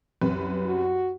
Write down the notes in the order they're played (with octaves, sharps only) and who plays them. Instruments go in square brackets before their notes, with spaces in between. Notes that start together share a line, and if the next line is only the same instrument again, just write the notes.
[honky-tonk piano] C2 F#2 B4
[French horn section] F#4